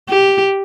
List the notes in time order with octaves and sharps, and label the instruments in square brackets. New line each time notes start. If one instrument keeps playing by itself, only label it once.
[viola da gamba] G4